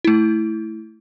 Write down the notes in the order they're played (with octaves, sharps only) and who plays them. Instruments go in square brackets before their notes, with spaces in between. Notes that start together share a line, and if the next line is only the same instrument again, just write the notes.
[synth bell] A3 E4